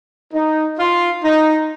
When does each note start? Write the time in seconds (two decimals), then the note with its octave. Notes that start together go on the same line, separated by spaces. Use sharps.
0.34 D#4
0.79 F4
1.24 D#4